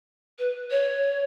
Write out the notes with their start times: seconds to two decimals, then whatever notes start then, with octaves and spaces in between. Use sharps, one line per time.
0.39 B4
0.71 C#5